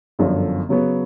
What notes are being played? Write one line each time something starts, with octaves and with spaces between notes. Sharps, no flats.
G1 F#2 D3 F3
C#3 F#3 B3